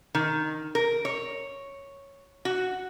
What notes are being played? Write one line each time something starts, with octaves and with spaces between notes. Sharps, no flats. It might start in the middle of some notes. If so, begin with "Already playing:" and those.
D#3
A#4
C#5
F#4